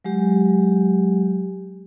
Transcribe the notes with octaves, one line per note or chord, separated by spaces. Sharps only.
F#3 G#3 G4